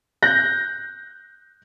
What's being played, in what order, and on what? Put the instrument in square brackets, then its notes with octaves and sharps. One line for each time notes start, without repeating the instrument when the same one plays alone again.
[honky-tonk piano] F#6 G6 A#6